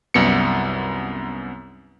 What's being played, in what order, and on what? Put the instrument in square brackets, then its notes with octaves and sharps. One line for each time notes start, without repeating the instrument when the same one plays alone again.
[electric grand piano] C2 F#2 B3 C#7